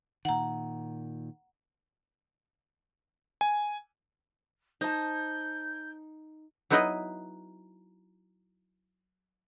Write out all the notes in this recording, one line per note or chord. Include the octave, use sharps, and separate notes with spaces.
A#2 D#3 F#5 A#5
G#5
D#4 C5 A5 G6
F#3 B3 D#4 E4 B4 D#5